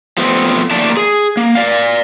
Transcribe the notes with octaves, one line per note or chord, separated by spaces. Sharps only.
F3 A3 B3 C4
A#2 D#3 A3 A#3 D5 A5
G#4
A#3
D5 F5